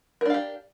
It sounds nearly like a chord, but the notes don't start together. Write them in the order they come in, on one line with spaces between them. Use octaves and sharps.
A#4 D4 F5 G4